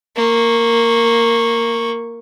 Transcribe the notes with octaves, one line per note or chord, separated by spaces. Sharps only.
A#3 C#6